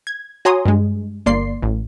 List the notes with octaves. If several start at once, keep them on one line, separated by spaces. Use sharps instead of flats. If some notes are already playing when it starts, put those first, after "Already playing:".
G#6
F#4 C#5 G#5 A#5 C6 D#6
G2 G#3
G1 A#3 D5 C6 C7
A1